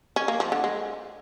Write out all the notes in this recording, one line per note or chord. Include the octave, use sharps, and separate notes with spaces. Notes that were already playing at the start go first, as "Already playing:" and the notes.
C#4
A#3
F3
D3
G#3